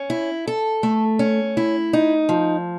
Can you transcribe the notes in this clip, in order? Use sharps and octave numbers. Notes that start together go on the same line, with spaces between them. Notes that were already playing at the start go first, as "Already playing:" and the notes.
Already playing: C#4
E4
A4
A3
C#4
E4
D#4
F3